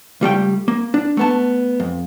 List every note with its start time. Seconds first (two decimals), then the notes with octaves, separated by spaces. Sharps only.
0.21 C#2 G3 A3 G5
0.68 A#3
0.94 D4
1.17 A3 B3 A5
1.80 F2